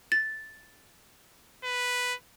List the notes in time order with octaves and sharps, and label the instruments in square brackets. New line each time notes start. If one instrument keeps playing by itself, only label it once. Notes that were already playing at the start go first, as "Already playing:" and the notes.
[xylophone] A6
[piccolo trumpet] B4